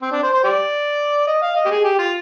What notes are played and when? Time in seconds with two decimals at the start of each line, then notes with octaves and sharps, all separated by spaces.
0.02 C4
0.12 D4
0.23 C5
0.33 C5
0.44 G4 D5
1.28 D#5
1.42 F5
1.56 D#5
1.65 G4
1.71 G#4
1.84 G4
1.99 F4